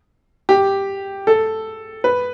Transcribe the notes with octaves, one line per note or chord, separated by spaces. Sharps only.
G4
A4
B4